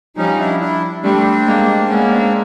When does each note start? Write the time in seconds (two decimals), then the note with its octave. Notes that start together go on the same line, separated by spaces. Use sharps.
0.17 F3 G3 C#4 D#4
0.39 D4 E4
0.60 D4 E4
1.03 G3 A3 C4 D4
1.46 G#3 A#3
1.89 G#3 A#3 B3 C#4
2.11 C4 D4